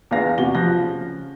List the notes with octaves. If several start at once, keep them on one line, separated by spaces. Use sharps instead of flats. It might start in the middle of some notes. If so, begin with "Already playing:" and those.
E2 D4 B4 F5 A#6
C3 F#4 G7
F3 F#6 A#6
C#3